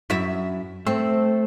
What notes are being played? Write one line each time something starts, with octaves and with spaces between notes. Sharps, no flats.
F#2 E4 E5
A3 C4